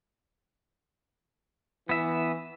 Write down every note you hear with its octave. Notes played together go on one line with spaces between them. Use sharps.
E3 B3 E5